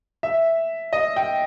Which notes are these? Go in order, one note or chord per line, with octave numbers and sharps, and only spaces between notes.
E5
D#5
G5